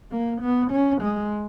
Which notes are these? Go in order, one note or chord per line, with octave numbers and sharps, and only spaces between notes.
A#3
B3
C#4
G#3